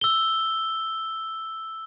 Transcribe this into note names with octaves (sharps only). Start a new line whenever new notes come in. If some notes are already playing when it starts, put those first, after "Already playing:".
E6 G7